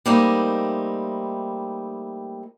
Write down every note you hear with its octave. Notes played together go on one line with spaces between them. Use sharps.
G3 A3 A#3 C4 D#4 E4